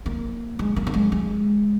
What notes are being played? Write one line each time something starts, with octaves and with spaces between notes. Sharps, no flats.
A#3
G#3
A#3
A#3
G#3
G#3